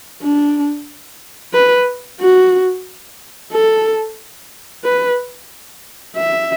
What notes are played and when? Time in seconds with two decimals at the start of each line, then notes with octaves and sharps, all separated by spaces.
0.22 D4
1.53 B4
2.20 F#4
3.52 A4
4.84 B4
6.16 E5